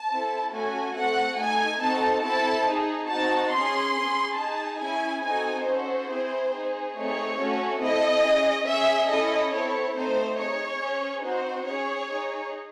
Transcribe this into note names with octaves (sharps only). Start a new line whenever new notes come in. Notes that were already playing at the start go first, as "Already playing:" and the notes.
Already playing: A5
C4 E4 A4
A3 C#4 F#4 A4 G#5
A3 C4 F#4 A4 F#5
A3 D#4 A4 G#5
C4 D#4 F#4 A4 A5
C4 E4 A4 A5
D#4 G#4
C4 D#4 F#4 A5
C#4 G#4 C6
C#4 G#4
D#4 G#4 A5
C#4 E4 G#4 G#5
C4 D#4 F#4 A4 G#5
C#4 F#4 A4 C5
C4 E4 G#4
D#4 G#4
A3 C4 D#4 G#4 C#5
A3 C#4 F#4 A4
C4 E4 A4 D#5
C#4 G#4
C#4 G#4 E5
C#4 E4 A4 D#5
C4 E4 A4 C#5
A3 C4 D#4 C5
D#4 G#4 C#5
C#4 G#4
C4 D#4 F#4 C5
C#4 G#4 C#5
D#4 G#4